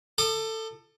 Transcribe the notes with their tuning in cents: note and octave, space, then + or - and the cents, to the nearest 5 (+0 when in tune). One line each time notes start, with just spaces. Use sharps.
A4 +15 D#6 -45